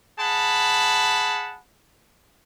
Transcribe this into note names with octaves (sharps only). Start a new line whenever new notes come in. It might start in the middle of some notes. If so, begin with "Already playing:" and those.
G#4 F#5 A5 B5